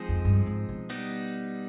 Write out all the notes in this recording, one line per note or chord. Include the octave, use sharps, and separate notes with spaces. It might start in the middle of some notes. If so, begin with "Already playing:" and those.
Already playing: F3 G#3 C4 D#4 G#4
F2
G2
G#2
B2
G3 B3 D#4